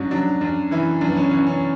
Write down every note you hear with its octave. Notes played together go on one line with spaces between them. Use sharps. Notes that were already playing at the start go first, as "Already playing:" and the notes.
Already playing: G#2 F#3 C#4 D4
F#3 D4
F#2 D4
E3 E4
F#2 D4
B3
C#4
E3 C#4
C#4